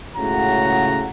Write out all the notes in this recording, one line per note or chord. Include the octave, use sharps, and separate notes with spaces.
C#2 A2 C#3 F#4 F#5 A#5